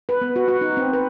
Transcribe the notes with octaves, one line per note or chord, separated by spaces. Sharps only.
B4
B3
F#4
F#4
D#4
C4
B4